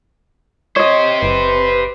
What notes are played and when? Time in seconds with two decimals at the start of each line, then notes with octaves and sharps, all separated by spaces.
0.76 G4 C5 C#5 D#5
1.23 F#1 B4